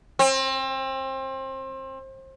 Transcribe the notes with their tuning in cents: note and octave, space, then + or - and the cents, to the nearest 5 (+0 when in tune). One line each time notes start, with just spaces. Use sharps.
C4 +30